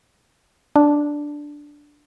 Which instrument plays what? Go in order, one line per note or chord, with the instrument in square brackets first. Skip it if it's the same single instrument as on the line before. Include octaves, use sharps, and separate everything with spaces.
[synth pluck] D4